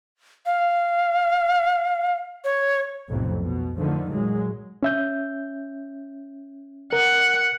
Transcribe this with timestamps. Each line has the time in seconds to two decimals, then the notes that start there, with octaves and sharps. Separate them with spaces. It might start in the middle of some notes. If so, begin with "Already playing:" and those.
0.46 F5
2.44 C#5
3.09 B1 F2 A2 C3
3.42 B2
3.77 D3 D#3 F3 A3
4.11 A#2 F#3 G#3
4.83 C#4 E5 G6
6.93 A#4 F#5